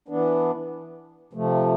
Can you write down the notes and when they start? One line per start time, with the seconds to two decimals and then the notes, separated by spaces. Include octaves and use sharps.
0.08 E3 B3 D4
1.33 C3 F3 A3